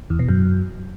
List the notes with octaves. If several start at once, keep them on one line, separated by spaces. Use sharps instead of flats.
E2
B2
F#2